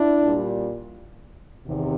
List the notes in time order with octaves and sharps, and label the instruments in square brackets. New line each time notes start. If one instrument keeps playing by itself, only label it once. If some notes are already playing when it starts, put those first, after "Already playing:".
Already playing: [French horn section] D4 E4
A#2 G3
E2 C3 D#3